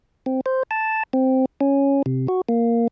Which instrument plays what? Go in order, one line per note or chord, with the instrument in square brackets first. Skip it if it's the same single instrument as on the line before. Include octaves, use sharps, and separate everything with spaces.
[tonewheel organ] C4
C5
A5
C4
C#4
C3
F#4
A#3